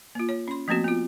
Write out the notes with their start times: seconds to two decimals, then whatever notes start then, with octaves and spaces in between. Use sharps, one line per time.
0.15 A#3 F4
0.29 C#5
0.48 C#4 C6
0.68 F3 A3 A#3 C4 F#4
0.84 B3 F4